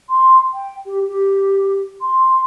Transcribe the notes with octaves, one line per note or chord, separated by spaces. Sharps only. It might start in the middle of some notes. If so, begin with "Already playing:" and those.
C6
G5
G4
G4
C6